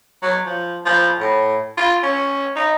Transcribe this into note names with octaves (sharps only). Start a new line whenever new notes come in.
F#3
F3
F3
A2
F4
C#4
D#4